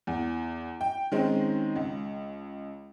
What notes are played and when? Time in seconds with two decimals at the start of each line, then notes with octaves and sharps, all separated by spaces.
0.07 E2
0.81 G5
1.12 D#3 G#3 C4 C#4 D#4
1.76 C#2